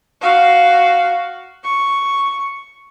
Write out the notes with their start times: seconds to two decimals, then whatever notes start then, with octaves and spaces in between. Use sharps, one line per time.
0.21 F#4 F5
1.64 C#6